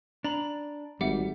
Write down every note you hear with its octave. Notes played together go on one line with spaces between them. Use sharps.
D4 A#5 B5 F#7
G#1 G3 E5 F#5 D6